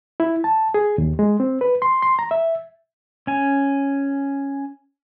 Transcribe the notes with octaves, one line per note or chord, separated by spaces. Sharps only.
E4
A5
G#4
D#2
G#3
C4
B4
C6
C6
A#5
E5
C#4 G#5